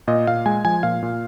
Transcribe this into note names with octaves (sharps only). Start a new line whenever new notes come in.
A#2 D#5
A#2 F5
G#3 G#5
F3 G#5
A#2 F5
A#2